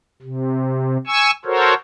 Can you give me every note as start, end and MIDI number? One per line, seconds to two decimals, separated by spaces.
0.22 0.97 48
1.07 1.31 80
1.07 1.31 85
1.07 1.31 88
1.45 1.74 66
1.45 1.74 69
1.45 1.74 70
1.45 1.74 72
1.45 1.74 73